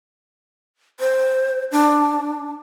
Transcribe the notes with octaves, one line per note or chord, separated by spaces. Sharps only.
C5
D4